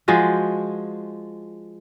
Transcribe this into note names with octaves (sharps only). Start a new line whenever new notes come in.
F3 G#3 F#4